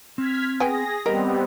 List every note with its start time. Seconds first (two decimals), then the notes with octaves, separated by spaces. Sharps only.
0.18 C4 F6 G#6 B6
0.60 B3 G#4 G5 G#5 A#6
1.06 G3 B3 C4 G4 A#4 D#5